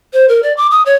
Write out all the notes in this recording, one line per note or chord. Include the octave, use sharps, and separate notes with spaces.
C5
A#4
D5
D6
D#6
C#5